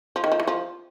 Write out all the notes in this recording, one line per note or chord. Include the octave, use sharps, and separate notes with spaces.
F3
D#3
F3
E3
F3